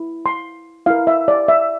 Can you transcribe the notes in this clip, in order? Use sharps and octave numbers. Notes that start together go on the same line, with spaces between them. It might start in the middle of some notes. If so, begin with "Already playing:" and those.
Already playing: E4
C6
E4 A#4 F5
E5
D5
E5